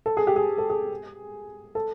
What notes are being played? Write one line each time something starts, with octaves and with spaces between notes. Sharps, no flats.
A4
G#4
G4
G#4
A4
G#4
A4